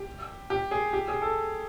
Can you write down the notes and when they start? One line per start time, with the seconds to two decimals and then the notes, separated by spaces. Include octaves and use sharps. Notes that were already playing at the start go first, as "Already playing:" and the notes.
Already playing: G4
0.50 G4
0.71 G#4
0.93 G4
1.08 G#4
1.22 A4